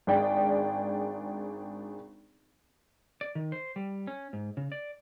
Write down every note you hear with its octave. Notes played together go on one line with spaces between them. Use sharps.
G#1 D4 G#4 D5 G5
D5
D#3
C5
G3
C#4
G#2
C#3
D5